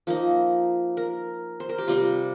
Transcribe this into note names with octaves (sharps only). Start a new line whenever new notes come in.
F3 A#3 D#4
A#4
C5
A#4
G4
C3 G3 C4 F4